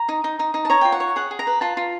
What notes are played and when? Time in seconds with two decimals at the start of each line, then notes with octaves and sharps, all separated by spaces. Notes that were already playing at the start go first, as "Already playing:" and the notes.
Already playing: A#5
0.09 D#4
0.24 D#4
0.39 D#4
0.54 D#4
0.65 A5
0.70 C#5 A#5
0.81 F4 G5
0.92 F#5
1.00 C#5
1.16 G#4 F#5
1.31 G#4
1.39 A#5
1.47 B4
1.61 F4 A5
1.77 F4